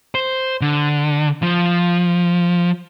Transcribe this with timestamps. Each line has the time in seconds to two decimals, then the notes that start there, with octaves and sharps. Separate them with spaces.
0.15 C5
0.61 D3
1.42 F3